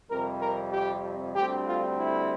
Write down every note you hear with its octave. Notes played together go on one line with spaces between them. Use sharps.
F2 C3 G3 A#4
A#4
G4
D2 D3 G3 C4 G4
F4
E4